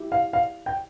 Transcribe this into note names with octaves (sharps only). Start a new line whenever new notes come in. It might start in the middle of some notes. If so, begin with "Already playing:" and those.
Already playing: E4 G4
F5
F5
G5